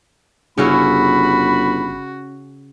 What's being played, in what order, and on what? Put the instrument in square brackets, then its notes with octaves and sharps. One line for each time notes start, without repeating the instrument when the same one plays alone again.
[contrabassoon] G1 [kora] C#3 C#4 E4 [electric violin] F#4 [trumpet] B5